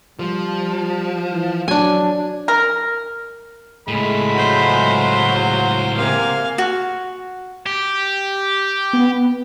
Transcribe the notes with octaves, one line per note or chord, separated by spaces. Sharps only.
F3 G3
E3
F#3 D4 G#5
A#4
C#2 A2 G#3 A3 B5
F#3 F4 C5
C3 A#3 F5 G#5
F#4
G4
B3